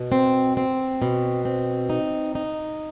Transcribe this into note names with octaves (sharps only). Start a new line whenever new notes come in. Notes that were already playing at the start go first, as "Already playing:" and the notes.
Already playing: B2
C4
C4
B2
C4
D#4
D#4